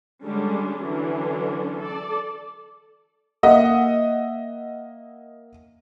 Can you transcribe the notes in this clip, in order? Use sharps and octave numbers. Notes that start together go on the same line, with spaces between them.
D3 G3 G#3 C#4 D4
D3 E3 F#3 C#4 D4
A4 D5
A#3 D#5 E5 F#5